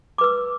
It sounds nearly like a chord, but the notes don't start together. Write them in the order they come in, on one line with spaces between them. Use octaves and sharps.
D6 B4 E6